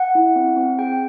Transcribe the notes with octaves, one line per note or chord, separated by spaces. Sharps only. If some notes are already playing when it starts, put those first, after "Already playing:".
Already playing: F#5
E4
C4
C4
G#4 G5